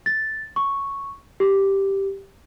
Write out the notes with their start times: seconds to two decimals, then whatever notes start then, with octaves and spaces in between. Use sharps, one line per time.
0.06 A6
0.56 C#6
1.40 G4